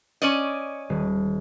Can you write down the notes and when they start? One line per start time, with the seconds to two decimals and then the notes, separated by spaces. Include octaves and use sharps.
0.22 C#4 D5 D#5
0.90 D#1